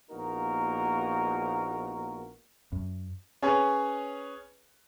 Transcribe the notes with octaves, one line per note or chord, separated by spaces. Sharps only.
A#1 A#3 B3 D#4 F#4 A#4
F#2
C#4 G#4 B4 C#5